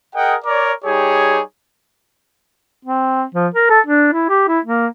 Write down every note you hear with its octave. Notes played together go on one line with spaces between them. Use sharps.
G#4 A#4 D#5 F#5 G5
A#4 C#5 D5
G3 D#4 G4 G#4 C#5
C4
F3
A#4
A4
D4
E4
G4
E4
A#3